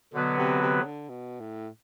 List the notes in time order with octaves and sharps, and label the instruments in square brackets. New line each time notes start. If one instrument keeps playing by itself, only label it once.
[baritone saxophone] B2 [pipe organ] D3 F#3 B3 F#4 B4
[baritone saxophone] C3
C3
D3
B2
A2